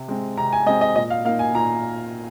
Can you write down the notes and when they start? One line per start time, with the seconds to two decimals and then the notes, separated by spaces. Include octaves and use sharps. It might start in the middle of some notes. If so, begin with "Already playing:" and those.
Already playing: C3
0.08 G#3 C4
0.37 C3 A#5
0.53 G#5
0.66 G#3 D#5
0.69 C4
0.81 D#5
0.96 A#2 D#5
1.10 F5
1.25 A#3 F5
1.28 D#4
1.39 G#5
1.54 A#2 A#5